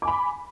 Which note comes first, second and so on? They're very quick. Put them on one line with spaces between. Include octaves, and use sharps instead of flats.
D6 G#5 B5